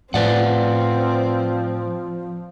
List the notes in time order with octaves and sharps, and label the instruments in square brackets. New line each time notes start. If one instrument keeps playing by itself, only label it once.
[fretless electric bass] A2 [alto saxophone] F3 [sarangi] C4 [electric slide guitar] B4 D5 F#5